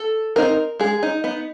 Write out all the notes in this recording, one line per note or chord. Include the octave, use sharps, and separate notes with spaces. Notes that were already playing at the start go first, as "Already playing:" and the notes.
Already playing: A4
C4 D#4 A#4
G#3 G#4
D#4
B3 D#4